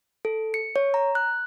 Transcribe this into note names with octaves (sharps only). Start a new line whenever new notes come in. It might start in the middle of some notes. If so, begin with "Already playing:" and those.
A4
C#7
C#5
A#5
F#6